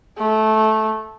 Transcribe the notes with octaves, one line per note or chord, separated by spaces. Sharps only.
A3